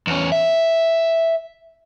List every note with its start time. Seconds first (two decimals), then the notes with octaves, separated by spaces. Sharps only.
0.07 E2 C#4
0.32 E5